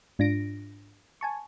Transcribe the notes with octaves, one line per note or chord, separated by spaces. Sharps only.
G#2 D4 F4 A#6 D7
G#5 A5 C#6